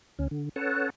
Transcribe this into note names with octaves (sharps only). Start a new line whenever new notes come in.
D2 C#4
D3
C#4 A4 B4 C#5 F#5 A5